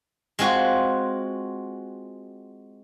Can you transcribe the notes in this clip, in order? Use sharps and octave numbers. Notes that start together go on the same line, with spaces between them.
G#3 C4 F4 F#4